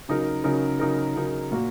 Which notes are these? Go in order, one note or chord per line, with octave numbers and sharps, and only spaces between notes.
C#3 F#3 D#4 A#4
C#3 F#3 D#4 A#4
C#3 F#3 D#4 A#4
C#3 F#3 D#4 A#4
A#2 A#3 F#4 A#4